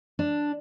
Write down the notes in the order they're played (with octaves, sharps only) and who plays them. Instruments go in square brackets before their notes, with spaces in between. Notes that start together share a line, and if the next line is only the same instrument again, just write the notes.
[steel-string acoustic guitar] D4